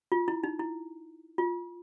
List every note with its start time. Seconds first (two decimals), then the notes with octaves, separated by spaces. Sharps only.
0.12 F4
0.28 E4
0.43 D#4
0.59 E4
1.38 F4